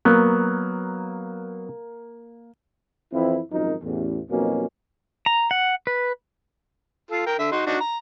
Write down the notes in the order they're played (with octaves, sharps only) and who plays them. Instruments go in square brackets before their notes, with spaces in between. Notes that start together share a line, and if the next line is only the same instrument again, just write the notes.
[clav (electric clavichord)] F#3 B3 [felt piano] A#3
[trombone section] F2 E3 C4 E4
G#1 F#2 F3 D#4 A#4
A1 E2
F2 B2 F#3 A#3 C#4 D#4
[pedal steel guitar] A#5
F#5
B4
[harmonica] F4 A4
A#4 G5
D3 E5 E6
D#4 F#4 C6
D4 D#4 F#4
A#5